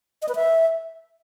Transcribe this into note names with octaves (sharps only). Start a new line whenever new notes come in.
D#5
B4
E5